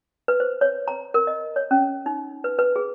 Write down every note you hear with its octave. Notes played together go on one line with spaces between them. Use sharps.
B4
C5
C#5
A#5
A#4
D#5
C#5
C#4
D#4
B4
B4
G#4